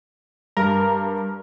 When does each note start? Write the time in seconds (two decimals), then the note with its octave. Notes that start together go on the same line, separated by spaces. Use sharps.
0.57 G2 A#4